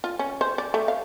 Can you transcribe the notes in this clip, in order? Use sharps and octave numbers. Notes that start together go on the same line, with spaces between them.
F4
C#4
C5
D5
A3
F5